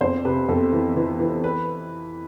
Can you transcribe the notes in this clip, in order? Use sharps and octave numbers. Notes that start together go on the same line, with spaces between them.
F2 C5
C3 B4
F2 A4
E3
E3
E3
B4